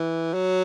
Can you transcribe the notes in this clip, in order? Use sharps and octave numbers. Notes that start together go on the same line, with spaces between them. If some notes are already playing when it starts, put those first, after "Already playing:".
Already playing: E3
F#3